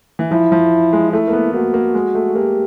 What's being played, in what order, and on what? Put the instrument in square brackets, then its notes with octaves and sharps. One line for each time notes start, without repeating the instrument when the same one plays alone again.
[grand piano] E3
[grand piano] F3 [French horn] E4
[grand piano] F3
G#3
[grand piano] A3 [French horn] E4
[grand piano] A#3
B3
[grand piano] A#3 [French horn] F#4
[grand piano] A#3
G#3
A3
[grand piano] A#3 [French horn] G4